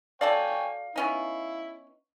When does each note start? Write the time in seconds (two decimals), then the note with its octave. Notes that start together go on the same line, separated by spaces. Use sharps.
0.21 F#4 A4 C#5 D5 F5 G5 G#5
0.96 B3 C#4 D#4 E4